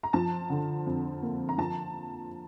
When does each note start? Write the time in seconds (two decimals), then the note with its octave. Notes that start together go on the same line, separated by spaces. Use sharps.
0.03 A#5
0.13 F3 A5
0.50 D3
0.87 F2
1.23 A#3
1.49 A#5
1.58 F3 A5